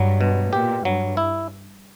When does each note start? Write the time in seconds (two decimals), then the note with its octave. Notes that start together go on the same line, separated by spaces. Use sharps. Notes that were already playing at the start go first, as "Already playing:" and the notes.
Already playing: G2 F#3
0.21 B2
0.52 A#2 G4
0.85 G2 F#3
1.17 E4